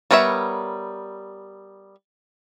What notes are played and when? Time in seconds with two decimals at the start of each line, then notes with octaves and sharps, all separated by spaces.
0.11 G3 B3 A#4 C#5 E5